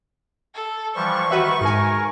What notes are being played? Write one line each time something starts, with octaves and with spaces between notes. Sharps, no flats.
A4
E3 F3 G3 C#6
D#3 F#4 B4 E5
G#2 A#4 G#5